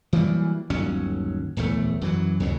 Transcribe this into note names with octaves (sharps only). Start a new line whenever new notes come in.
E3 F#3 G3 A#3
G1 D#2 F#3 C#4
D1 A#1 E2 A3
F#2 E3 F#3
D2 C#3 F#3